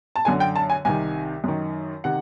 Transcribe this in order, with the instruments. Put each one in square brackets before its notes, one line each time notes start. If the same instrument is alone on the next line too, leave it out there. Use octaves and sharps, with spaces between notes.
[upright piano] A5
F#2 D3 G#5
G5
A5
G#5
C2 C3 D#3 G#5
F#2 D#3
C3 D#3 F#5